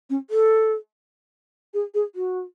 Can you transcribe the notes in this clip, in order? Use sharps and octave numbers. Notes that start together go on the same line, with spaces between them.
C#4
A4
G#4
G#4
F#4